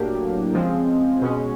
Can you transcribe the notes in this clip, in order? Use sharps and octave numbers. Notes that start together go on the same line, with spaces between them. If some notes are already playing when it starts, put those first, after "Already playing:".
Already playing: A2 F#3 A#3 D4 G4
C#3 F3 G#3 C4
B2 G#3 C#4